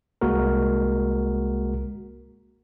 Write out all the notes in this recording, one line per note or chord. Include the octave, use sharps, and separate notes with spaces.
C2 G#3 A#3 F#4 A#4